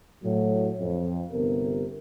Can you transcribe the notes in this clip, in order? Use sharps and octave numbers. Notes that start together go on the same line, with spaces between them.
A2 F#3
F2
G1 C3 B3 A#4